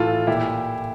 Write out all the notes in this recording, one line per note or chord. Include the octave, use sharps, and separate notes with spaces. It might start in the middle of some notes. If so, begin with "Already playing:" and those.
Already playing: A2 E3 F4 A4
A#2 E4 G4